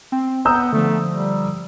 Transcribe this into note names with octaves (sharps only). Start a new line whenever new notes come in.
C4
B3 A#5 D#6 E6 G6
D3 F3 A3
G3